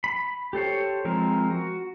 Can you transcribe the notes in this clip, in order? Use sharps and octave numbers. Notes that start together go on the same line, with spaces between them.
B5
G4 A4 C5 C#5
F3 G#3 C4 A#4
F#4